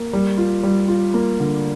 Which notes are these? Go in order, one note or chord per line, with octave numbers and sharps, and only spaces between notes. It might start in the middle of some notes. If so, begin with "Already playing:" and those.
Already playing: A#3
G3
F4
G3
F4
A#3
D3